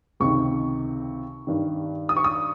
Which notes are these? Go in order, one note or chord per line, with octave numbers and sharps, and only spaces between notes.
C#2 C3 D#3 C#6
G2 D#3
D#6
C#6
D#6